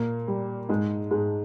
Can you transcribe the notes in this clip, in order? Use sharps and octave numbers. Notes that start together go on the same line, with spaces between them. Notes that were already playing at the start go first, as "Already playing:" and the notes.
Already playing: A#2 A#3
G3
G#2 G#3
G#2 G#3